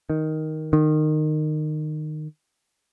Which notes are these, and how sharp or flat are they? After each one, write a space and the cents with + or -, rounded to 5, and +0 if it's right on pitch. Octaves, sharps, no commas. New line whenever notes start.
D#3 +5
D#3 -20